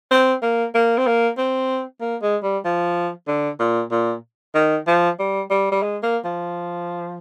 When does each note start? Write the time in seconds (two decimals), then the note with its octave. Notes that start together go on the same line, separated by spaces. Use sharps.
0.12 C4
0.43 A#3
0.75 A#3
0.98 C4
1.07 A#3
1.38 C4
2.01 A#3
2.22 G#3
2.43 G3
2.65 F3
3.28 D3
3.60 A#2
3.91 A#2
4.55 D#3
4.87 F3
5.19 G3
5.51 G3
5.72 G3
5.83 G#3
6.03 A#3
6.25 F3